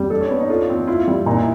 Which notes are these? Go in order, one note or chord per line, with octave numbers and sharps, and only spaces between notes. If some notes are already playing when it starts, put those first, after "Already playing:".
Already playing: G3
D4 A4
C#4
B3 D4
D#4
F4 A4
C4
E4 F4
G3
A#2 D#4
E4